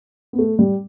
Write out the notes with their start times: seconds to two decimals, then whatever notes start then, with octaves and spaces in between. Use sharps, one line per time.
0.33 B3
0.38 A3
0.59 G3